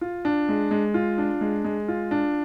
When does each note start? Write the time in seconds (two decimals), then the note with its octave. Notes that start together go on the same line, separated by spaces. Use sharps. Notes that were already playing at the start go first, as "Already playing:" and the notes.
0.01 F4
0.25 D4
0.49 G#3
0.71 G#3
0.94 F4
1.18 D4
1.41 G#3
1.64 G#3
1.88 F4
2.11 D4